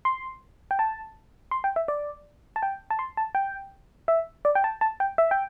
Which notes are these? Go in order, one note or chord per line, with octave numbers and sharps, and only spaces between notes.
C6
G5
A5
C6
G5
E5
D5
A5
G5
A5
C6
A5
G5
E5
D5
G5
A5
A5
G5
E5
G5